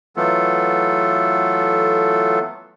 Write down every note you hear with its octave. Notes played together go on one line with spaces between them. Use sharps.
E3 F#3 A3 B3 F4 A4